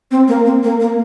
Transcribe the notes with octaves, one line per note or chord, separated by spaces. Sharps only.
C4
A#3
C4
A#3
A#3